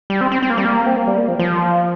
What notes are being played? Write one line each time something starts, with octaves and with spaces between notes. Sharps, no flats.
G3
C4
C4
C4
A#3
G3
A#3
C4
A#3
G3
A#3
F3
F3